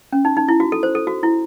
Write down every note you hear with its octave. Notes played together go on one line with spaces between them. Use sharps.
C#4
D#4
D#4
E4
F#4
A4
C5
A4
F#4
E4